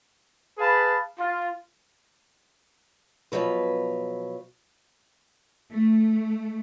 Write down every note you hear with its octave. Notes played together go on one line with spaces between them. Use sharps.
G#4 B4 F5 A5 B5
F4
B2 F3 F#3 B4
A3